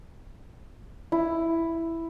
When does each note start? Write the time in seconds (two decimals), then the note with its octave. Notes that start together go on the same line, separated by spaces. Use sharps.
1.12 E4